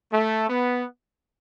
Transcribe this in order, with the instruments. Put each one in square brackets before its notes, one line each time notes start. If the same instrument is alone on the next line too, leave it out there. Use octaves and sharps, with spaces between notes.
[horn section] A3
B3